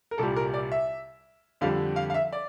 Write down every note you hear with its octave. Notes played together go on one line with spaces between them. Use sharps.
A#4
C2 A#2 G3 A4
A#4
D5
E5
F2 D3 G3 F5
F5
F5
E5
D5